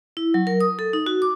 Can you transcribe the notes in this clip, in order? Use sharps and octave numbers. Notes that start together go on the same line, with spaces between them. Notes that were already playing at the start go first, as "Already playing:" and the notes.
E4
F#3
A#4
D#6
A4
D#4
F#4
D6